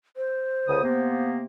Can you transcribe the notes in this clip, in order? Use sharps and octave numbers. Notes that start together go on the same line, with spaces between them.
C5
C#2 D3 D#6
C3 A#3 B3